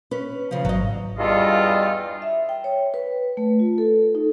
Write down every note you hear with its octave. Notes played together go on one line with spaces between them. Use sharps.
C#4 B4
C#3 F3
G#1 F#3 D#5
E2 G2 G3 F4 A4 D#5
E5
G5
C#5
B4
A3
F4
A4
D#4